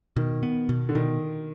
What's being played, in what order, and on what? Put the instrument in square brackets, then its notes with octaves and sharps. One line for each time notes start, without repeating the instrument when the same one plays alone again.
[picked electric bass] B2 [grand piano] D#3
[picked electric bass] B3
B2
[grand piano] D3
[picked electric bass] B2 [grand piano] D#3